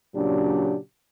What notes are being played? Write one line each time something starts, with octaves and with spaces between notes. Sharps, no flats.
A#2 C#3 F#3 D4 G4